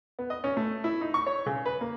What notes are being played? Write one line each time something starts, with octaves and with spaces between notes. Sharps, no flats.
B3
D#5
C#4
A3
E4
D#4
C#6
C#5
C#3
B4
A#3